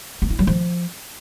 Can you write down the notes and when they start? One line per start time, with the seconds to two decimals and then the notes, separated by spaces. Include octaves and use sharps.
0.22 B3
0.30 E4
0.39 F#3
0.47 F3